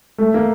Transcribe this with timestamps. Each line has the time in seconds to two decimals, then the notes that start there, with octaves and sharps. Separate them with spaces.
0.18 A3
0.34 A#3